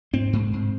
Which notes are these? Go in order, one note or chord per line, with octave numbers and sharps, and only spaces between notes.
G#2 C4
G#2
G#2